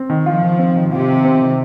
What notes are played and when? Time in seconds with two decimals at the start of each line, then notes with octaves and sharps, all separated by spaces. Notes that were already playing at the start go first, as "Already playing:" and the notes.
Already playing: C4
0.10 D#3
0.26 F3 F4
0.43 D#3
0.59 C4
0.76 D#3
0.92 C3 F4
1.09 D#3
1.25 C4
1.42 D#3